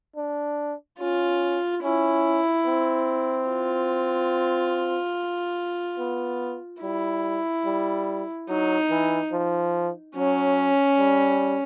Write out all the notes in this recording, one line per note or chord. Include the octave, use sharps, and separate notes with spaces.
D4
C#4 F4
C#4 E4
C4
F4
B3
G3 E4
G3
F#3 D#4
E3
F3
F#3 C#4
G3